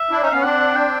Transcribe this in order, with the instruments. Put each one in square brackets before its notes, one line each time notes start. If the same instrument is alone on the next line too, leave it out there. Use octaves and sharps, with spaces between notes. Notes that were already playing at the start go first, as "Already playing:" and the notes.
Already playing: [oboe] E5
[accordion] D4 E4
C#4 D#4
[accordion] B3 C#4 [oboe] F5
[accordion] C4 D4 [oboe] F#5
[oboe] G5